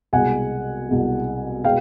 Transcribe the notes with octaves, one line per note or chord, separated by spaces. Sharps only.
C2 B2 G#3 F#5 G#5
C2 B2 G#3
B2 G#3 B3 F5 G5